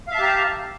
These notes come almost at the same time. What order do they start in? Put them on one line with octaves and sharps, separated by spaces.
F5 E5 A5 G4 A#5